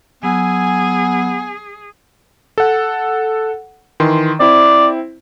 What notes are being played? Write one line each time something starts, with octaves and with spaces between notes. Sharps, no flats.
F#3 B3 G#4 G#5 E6
A4 F#5
D#3 E3 C6
C4 E4 D5